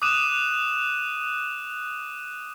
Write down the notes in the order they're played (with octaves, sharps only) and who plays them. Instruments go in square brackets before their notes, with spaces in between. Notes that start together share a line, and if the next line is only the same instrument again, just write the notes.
[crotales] D6 D#6 F#6 D#7 E7